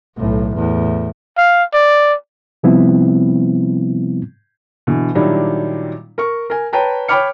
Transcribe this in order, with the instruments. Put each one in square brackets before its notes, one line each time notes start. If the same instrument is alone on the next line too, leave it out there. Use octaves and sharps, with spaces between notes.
[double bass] B1 A2
E2 A2
[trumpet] F5
D5
[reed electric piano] C3 F3 G3 B3 C4 E4
[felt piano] B2 D3 E3
A#2 D#3 F#3 G3 D4 E4
A#4 C#6
A#4 G#5
B4 C#5 G5 A5 A#5
C#5 G5 B5 D6 F6 C#7